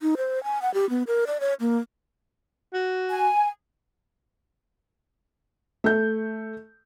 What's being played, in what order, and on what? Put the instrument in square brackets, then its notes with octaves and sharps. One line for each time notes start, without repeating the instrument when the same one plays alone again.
[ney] D#4
C5
G#5
F#5
G4
B3
A#4
D5
C#5
A#3
[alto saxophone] F#4
[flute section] G#5
[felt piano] A3 G6